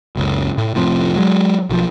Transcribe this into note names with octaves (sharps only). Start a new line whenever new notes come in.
F#1 C#2
A2
F1 A2 F3 C4
F#3 G#3
B1 D#3 F3